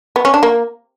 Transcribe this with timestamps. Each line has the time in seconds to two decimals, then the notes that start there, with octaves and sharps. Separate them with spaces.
0.16 B3
0.25 C#4
0.34 D4
0.43 A#3